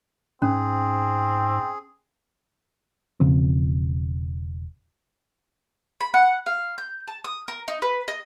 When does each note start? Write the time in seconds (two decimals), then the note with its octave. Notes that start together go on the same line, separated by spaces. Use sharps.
0.42 G#2 C4 C#4 G#4
3.20 E1 C#3 F3 C4
6.01 B5
6.14 F#5
6.46 F5
6.78 G6
7.08 A5
7.24 D#6
7.48 A#4
7.68 D#4
7.82 B4
8.08 D#5